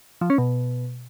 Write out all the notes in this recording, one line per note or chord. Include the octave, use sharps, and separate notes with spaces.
F3
C#4
B2